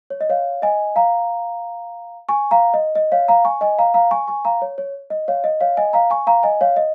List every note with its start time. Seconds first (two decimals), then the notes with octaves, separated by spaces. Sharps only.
0.10 C#5
0.21 D#5
0.30 C#5 F5
0.62 D#5 G#5
0.96 F5 A#5
2.29 G#5 C#6
2.51 F5 A#5
2.74 D#5
2.95 D#5
3.12 C#5 F5
3.28 F5 A#5
3.45 G#5 C#6
3.61 D#5 G#5
3.79 F5 A#5
3.94 F5 A#5
4.11 G#5 C#6
4.27 G#5 C#6
4.45 F5 A#5
4.62 C#5
4.78 C#5
5.10 D#5
5.28 C#5 F5
5.44 D#5
5.61 C#5 F5
5.77 D#5 G#5
5.93 F5 A#5
6.10 G#5 C#6
6.27 F5 A#5
6.43 D#5 G#5
6.61 C#5 F5
6.76 D#5